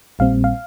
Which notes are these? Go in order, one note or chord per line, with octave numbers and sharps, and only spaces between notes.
A#1 A#2 G3 C4 F5
F5